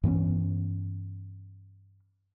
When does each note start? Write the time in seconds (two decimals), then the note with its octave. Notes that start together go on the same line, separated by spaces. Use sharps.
0.03 G2 E3 B3 C#4